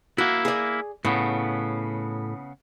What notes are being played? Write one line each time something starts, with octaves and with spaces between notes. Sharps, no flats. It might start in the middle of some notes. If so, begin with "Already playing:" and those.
A#3 E4 F#4
G#4 D5
A2 C#3 B3